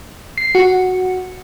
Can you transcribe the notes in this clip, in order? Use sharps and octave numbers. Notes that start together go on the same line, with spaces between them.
C7
F#4